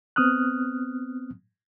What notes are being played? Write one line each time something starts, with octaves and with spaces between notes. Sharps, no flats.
B3 C4 D#6 F6 F#6